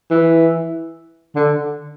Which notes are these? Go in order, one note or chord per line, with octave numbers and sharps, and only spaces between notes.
E3
D3